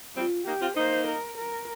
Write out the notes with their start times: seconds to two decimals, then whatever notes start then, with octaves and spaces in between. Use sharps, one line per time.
0.15 G3 C4 F4
0.46 A#3 D#4 G4
0.61 C4 F4
0.76 A#3 D#4 C5
1.07 A#4
1.38 A#4